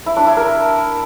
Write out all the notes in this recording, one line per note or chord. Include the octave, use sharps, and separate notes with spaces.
E4
D4
E4
A#4